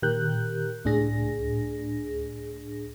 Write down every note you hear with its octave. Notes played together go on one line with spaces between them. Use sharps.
A#2 D#3 G4 A#4 F#6 G6
C#2 A2 D4 G#4 A#6